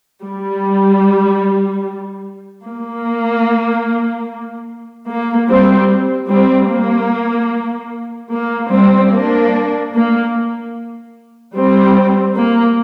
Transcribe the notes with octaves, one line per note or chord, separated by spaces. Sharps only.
G3
A#3
A#3
G3 C4
G3 C4
A#3
A#3
G3 C4
A#3 D4
A#3
G3 C4
A#3